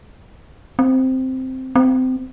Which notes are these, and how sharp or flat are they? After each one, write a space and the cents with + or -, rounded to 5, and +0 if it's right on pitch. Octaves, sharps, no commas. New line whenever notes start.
C4 -5
C4 -25